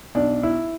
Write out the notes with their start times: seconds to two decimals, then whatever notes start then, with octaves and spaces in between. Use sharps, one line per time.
0.15 B1 D4
0.43 E4